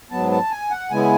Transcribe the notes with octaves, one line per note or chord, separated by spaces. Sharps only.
G#2 F#3 B3 A5
A5
G#5
F#5
C#3 G#3 B3 E4 G#5